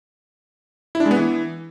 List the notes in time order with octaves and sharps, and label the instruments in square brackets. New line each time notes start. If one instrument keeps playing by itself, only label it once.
[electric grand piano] E4
D4
G#3
B3
E3